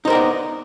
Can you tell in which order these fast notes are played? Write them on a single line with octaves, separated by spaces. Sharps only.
D#4 C5 A#4 D5 B3